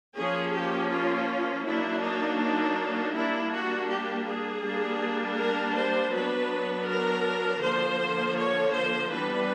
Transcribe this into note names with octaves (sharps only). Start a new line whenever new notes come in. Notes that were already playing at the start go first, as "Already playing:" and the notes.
F3 A#3 C#4 G#4
G4
F4
F#3 A#3 D4 E4
D#4
D#4
G3 A#3 D4 E4
F#4
G4
G#4
G3 A#3 D4
A#4
C5
F#3 B3 D4 B4
A#4
D3 F3 A#3 C5
C#5
C5
E3 G3 B3 D4 B4